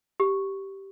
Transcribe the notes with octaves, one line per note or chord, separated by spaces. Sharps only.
G4